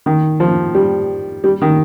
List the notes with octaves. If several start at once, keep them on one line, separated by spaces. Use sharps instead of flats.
D#3
F3
G3
G3
D#3